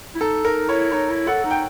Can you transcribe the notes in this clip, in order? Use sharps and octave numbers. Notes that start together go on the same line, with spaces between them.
E4
D#4 A4
D#4 A#4
E4 C#5
D#4 C#5
E4
A4 F#5
D#4
G5